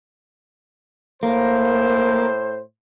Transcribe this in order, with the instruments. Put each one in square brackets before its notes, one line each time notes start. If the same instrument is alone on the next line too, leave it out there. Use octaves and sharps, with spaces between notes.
[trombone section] A2 C5 [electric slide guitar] A#3